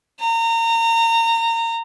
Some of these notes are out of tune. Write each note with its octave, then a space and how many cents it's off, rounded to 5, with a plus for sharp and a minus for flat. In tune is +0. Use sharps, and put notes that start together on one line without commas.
A#5 -25